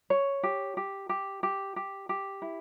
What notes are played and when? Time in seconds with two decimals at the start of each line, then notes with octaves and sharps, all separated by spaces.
0.10 C#5
0.43 G4
0.77 G4
1.09 G4
1.43 G4
1.76 G4
2.09 G4
2.42 E4